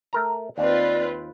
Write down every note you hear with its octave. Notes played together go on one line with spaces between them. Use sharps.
A3 A#4 A#5
D#2 C4 F4 B4 D5